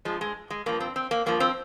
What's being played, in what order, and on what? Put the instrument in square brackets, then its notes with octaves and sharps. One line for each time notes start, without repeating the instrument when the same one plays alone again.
[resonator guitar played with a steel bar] G2 F3 G#3
G#3
G#3
G2 F3 A#3
C4
C4
A#3
G2 F3 A#3
C4